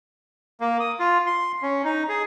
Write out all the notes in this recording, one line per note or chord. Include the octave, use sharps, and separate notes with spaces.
A#3
D#6
F4
C6
C#4
D#4
G#4